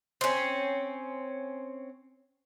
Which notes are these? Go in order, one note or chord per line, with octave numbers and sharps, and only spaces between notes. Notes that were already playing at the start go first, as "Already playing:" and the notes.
C4 C#4